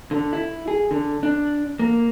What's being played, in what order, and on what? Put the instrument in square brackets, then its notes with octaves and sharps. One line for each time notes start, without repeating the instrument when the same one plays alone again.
[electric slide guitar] D3
E4
G#4
D3
D4
A#3